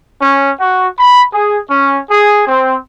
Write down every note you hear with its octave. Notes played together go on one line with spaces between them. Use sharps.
C#4
F#4
B5
G#4
C#4
G#4
C4